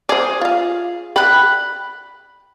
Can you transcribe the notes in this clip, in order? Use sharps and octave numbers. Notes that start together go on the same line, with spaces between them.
G#4 C5 D5
F4 F5
D5 G5 B5 F#6